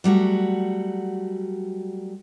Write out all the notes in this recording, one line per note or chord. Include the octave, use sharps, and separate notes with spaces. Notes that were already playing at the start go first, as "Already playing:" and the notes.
F#3 G3 A3 F#4